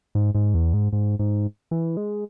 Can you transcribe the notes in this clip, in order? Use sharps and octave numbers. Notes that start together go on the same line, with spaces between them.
G#2
G#2
E2
G#2
G#2
G#2
E3
G#3